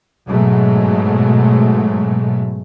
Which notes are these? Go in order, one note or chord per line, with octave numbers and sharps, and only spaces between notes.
G#2 B2 F#3 G#3 A3